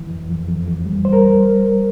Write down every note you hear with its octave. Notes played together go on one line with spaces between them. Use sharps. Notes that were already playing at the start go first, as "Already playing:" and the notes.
Already playing: E3
F2
F2
F2
F2
G3
G3 C5
A#4